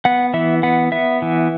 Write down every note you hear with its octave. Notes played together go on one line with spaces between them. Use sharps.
B3 F#5
E3 E5
B3 F#5
B3 E5
E3